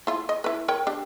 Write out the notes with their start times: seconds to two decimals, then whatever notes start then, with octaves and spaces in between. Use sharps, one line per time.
0.07 E4 F4
0.29 D#5
0.44 E4 B4
0.68 A#4 C#5 G5
0.87 D4 G4